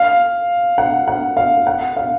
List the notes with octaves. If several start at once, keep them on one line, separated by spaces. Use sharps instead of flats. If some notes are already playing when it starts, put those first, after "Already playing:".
Already playing: F5
F#5
F#5
F5
F#5
F5